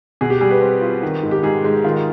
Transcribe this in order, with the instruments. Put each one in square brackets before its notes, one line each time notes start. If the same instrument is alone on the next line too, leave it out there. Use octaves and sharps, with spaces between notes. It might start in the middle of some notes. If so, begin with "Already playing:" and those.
[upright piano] B2 [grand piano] G#4
[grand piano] G4
[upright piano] G3 [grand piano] G#4
[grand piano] B4
[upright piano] C4
F4
D#3
G#2
[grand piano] G4
[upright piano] G#2 [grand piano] G#4
[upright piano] G#3
[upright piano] D#3 [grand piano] F4